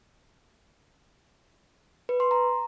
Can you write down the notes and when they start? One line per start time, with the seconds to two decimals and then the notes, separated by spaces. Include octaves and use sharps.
2.09 B4
2.20 C6
2.31 A#5